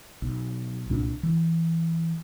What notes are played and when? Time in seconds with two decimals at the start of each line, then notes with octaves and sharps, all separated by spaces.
0.22 B1
0.90 C2 A#2 D4
1.23 E3